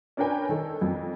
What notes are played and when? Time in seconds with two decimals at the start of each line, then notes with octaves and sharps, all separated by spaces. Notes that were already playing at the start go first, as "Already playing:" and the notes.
0.17 C#4 D4 A#4 B4 G5 G#5
0.49 D#3 A4
0.81 F2